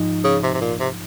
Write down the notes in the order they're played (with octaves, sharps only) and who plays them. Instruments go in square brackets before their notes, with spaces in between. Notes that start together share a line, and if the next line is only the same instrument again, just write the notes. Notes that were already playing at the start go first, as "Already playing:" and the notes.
Already playing: [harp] G#2 F3 C4 D#4
[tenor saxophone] C#3
C3
C3
A#2
C3